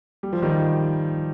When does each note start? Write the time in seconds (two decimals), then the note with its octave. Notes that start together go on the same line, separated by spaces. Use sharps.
0.23 G3
0.33 F3
0.42 D#3 G3